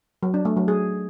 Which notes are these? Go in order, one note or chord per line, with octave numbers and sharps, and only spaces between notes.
F#3
D4
A3
F#3
G#4